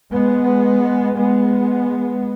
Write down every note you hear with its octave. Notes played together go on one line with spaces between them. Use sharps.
G#3 B3
G#3 B3